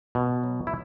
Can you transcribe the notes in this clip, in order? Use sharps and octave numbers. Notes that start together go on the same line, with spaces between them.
B2
F#3
E4